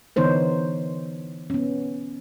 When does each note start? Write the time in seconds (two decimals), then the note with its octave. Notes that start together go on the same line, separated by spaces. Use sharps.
0.16 D3 E3 B3 D#4 C5 C#5
1.50 B3 C#4